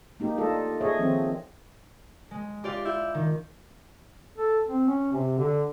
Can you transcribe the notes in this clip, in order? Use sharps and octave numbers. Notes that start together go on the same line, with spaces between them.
A#3 D#4 G4
D4 F4 A4 D#5
G#4 C#5 D#5 E5
D#3 F3 C4
G#3
F4 G4 D5 F5
E4 G6
D#3
A4
C4
C#4
C3
D3